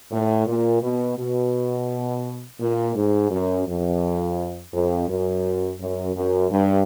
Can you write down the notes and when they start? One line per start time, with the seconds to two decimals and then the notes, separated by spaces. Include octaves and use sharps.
0.11 A2
0.46 A#2
0.81 B2
1.17 B2
2.60 A#2
2.95 G#2
3.30 F#2
3.67 F2
4.73 F2
5.08 F#2
5.79 F#2
6.14 F#2
6.50 G2